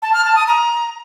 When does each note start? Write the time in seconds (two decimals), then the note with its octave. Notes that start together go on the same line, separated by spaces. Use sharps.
0.02 A5
0.14 F6
0.25 A5
0.36 D#6
0.47 A#5